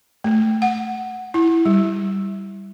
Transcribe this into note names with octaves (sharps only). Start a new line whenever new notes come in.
A3
F#5
E4
G3